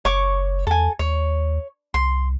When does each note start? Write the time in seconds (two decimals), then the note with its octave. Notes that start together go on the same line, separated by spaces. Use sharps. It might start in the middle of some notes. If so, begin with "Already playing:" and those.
0.05 F#1 C#5 C#6 D6
0.67 E2 A4 G#5
0.99 D#2 C#5
1.94 C2 C6